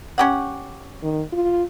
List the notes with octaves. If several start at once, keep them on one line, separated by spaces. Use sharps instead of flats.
C#4 G4 F#5
D#3
F4